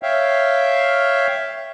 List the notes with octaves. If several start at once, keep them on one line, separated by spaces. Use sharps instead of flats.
C#5 E5 F5 G5